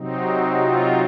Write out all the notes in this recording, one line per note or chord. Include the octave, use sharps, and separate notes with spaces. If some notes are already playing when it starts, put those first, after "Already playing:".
Already playing: C3 F#3 C4 D#4
F#4
F4